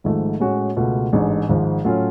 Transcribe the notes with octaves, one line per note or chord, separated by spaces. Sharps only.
G#1 G#2 F3 A3
A2 G#3 C#4 F#4
C#2 B2 A3 F4
A1 G#2 G#3 D4
G#1 G#2 F3
A2 F#3 A3 C#4 F4